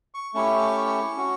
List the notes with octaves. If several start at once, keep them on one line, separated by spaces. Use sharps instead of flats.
C#6
A3 C#4 E4 G4 C#6
C#4 F#4